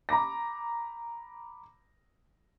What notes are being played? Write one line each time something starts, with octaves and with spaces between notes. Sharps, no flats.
A#5 B5 D6 A#6